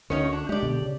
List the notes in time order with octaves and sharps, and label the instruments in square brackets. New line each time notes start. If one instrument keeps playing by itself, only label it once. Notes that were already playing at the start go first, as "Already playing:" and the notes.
[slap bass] D2 D3 [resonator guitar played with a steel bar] C#4 D#4 C#5
[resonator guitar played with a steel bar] D4
[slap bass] G#3 [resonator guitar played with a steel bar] G4 D5
[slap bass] B2 D3
C#3